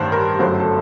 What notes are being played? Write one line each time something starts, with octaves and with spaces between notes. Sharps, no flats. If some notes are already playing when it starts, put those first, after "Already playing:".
Already playing: A1 G2 D#3 C5
A#4
G1 F#2 F#3 A3 C5
A4